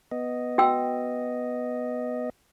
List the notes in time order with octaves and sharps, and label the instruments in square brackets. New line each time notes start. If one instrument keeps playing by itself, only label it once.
[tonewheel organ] B3 D#5
[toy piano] F#4 G5 E6